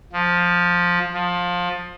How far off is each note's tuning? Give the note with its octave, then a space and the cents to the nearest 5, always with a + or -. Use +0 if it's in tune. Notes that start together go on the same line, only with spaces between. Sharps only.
F3 +10
F3 +20